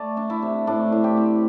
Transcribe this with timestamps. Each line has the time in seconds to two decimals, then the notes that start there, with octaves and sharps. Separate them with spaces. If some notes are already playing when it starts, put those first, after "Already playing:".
Already playing: A3 D5
0.17 D4
0.30 E4
0.42 C3
0.67 A2 D4
0.92 A2
1.04 G4
1.17 C4